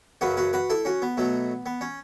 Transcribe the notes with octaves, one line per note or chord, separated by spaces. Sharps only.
F#2 C#3 F#3 F#4 B4
F#4 B4
F#4 B4
E4 A4
C#4 F#4
B3
B2 F#3 A3
B3
C#4